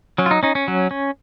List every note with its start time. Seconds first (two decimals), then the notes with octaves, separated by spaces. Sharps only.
0.18 F#3 C#4
0.26 F4
0.31 D#4
0.43 C#4 D#4
0.55 C#4
0.68 F#3
0.91 C#4